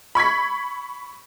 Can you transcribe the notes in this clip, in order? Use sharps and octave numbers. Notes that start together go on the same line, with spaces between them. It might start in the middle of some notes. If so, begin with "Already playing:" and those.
B5 C#6 G#6 B6